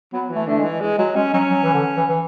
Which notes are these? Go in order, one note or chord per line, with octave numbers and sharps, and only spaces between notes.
F#3 B3
E3
A3
D3 A3
G#3
E3
G#3
F#3 G#3
G#3 C#4
F#3 C#4
F#3
E3
D3
E3
E3